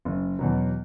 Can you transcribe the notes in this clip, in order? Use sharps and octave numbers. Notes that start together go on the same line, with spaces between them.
F#1
E2 B2 F#3